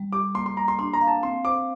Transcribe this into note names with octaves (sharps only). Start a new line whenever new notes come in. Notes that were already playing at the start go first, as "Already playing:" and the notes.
Already playing: G3
G4 D6
A#3 C6
C6
A#3 A#5
C6
D4 C6
A#5
F5
A5
C4 C6
C5 D6